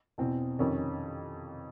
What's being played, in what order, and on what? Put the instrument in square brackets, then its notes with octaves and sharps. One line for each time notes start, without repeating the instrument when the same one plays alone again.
[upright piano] E2 B2 C4
F2 C3 D#3 C#4